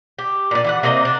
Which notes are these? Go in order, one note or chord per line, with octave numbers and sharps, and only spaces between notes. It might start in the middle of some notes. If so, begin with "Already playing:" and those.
G4
A#2 D4
E3 C5 F#5
C3 A#3 C4 D#5
D4